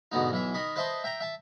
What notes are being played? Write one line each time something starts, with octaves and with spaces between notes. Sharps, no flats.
G#2 B2 D3 B3 D#4
B1 E3 E5
D#3 D#5 B5 C#6
B4 C5 D#5 E5 A5 C6
E5 G5 A#5
E5 A5